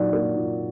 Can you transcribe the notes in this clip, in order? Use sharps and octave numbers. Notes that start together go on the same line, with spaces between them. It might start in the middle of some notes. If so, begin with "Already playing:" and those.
Already playing: A#2 F#3 D#4 D5
A#3
A#2